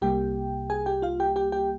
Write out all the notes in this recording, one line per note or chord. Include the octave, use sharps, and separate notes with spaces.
C2 C3 G3 A#3 G4 G5
G#4 G#5
G4 G5
F4 F5
G4 G5
G4 G5
G4 G5